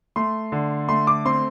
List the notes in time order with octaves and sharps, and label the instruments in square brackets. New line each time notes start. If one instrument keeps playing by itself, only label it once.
[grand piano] A3 C6
D3
A3 C6
D6
C4 C6